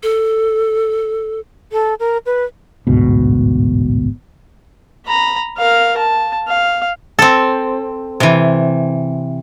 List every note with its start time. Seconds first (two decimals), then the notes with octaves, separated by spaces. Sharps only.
0.03 A4
1.72 A4
2.00 A#4
2.26 B4
2.87 A1 D2 G#2 B2
5.07 A#5 B5
5.57 A#4 F5
5.98 A5
6.47 F5
7.19 C4 A4
8.20 C3 E3